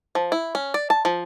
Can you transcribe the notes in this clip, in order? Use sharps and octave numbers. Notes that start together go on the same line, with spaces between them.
F3
E4
C#4
D5
A5
F3